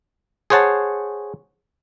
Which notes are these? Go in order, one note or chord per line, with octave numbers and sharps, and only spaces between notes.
G#4 C5 C#5 F#5 A5